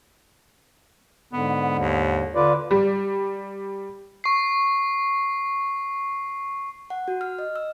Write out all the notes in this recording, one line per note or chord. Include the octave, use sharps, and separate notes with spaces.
G#2 D3 B3
D#2
D3 F4 B4 D5
G3
C#6 C7
F#5
F#4
F6
D#5
E6